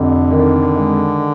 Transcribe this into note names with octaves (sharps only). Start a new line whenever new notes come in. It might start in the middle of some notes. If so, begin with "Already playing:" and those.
Already playing: F1 F2 D3
D#3
G#3